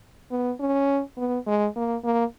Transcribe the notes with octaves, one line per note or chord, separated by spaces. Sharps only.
B3
C#4
B3
G#3
A#3
A#3